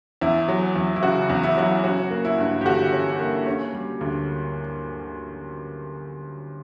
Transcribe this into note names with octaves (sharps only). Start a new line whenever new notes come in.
E2 E4
F#3
E2
E4
C#3 F#4
E2
E4
F#3 E4
C#4 F#4
A#3
E4
G2
G4
D3 F#4
C#4
A#3
C#4
G3
D2